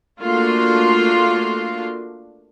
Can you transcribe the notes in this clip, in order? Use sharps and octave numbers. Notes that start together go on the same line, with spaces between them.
A3 A#3 D4 F4 F#4 C6